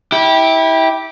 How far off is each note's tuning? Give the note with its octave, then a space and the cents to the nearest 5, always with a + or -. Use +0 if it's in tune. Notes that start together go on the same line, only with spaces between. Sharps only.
E4 -25 G4 +0